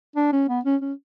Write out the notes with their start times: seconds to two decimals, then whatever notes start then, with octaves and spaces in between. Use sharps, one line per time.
0.16 D4
0.33 C#4
0.49 B3
0.65 C#4
0.82 C#4